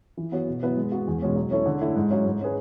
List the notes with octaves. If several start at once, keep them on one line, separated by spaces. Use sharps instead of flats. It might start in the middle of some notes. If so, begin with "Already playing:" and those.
E3
B3 F#4 C#5
B2
F#3 B3 E4 B4
G#3
B3 F#4
E2
B2 G#3 C#4
F#3
C#4 E4 A4 C#5
D3
A3 E4
G#2
F#3 C#4 E4
G#2
G#3 C#4 G#4 B4